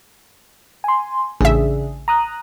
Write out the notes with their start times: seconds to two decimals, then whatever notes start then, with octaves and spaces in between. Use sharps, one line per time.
0.84 G#5 C6
1.41 A1 C#3 D4 G#4 E5
2.08 A#5 D#6 F#6